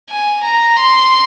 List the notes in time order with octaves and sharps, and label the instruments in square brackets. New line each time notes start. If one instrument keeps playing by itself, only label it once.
[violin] G#5
A#5
C6